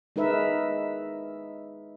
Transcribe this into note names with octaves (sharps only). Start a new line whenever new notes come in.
G#3 D#4 A#4 B4 E5